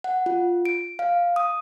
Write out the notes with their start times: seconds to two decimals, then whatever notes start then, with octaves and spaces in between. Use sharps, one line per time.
0.04 F#5
0.26 F4
0.65 D7
0.99 F5
1.36 D#6